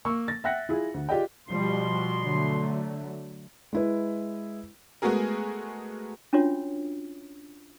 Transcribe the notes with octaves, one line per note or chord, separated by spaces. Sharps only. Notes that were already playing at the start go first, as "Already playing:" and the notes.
A#3 C#6 E6
A6 A#6
E5 F#5 G5 F#6 A#6 C#7
E4 F4 G#4
D2
F4 G4 G#4 D5 D#5 G5
B2 F3 G3 C6
D3 F#3 A3
G#3 E4 B4
G#3 A3 B3 F#4 G#4 A#4
C#4 D4 F4 F#4 C#5